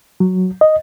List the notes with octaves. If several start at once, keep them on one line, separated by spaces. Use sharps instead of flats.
F#3
D#5